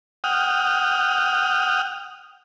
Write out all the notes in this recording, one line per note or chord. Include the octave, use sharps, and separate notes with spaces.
F#5 G5 D#6 F6